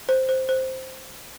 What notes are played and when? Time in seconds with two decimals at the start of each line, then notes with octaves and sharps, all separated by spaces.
0.09 C5
0.29 C5
0.49 C5